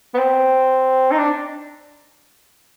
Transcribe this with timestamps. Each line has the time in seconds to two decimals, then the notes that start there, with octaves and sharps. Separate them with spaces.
0.14 B3
0.19 C4
1.11 D#4
1.18 D4